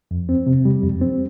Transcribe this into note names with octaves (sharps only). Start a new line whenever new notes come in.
F2
C4
C3
G3
F2
C4